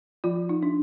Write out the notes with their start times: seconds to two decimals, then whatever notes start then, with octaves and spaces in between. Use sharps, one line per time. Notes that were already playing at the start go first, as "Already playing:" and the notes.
0.24 F3 F4
0.49 D#4
0.62 D4